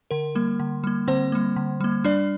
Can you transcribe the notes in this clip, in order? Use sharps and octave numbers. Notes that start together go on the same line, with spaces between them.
D3 A#4
G3 A#3
D3
G3 A#3
D3 C4 C5
G3 A#3
D3
G3 A#3
G3 D4 D5